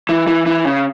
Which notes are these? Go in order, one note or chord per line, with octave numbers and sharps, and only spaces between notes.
E3
E3
E3
C#3